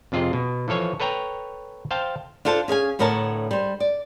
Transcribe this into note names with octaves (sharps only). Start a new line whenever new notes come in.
F2 C3 F4 G#4 D#5
B2
E3 F3 A4 C#5 G#5
A4 B4 C#5 G5 A#5
C5 F5 G5 A5
D4 F4 A4 C5 A5
C#4 G#4 F5 G#5
D2 A2 B3 A#4 C#5 A5
G3 C5
D5